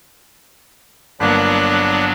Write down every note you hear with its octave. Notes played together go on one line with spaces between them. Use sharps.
G1 F#3 A#3 B3 D4 D5 F#6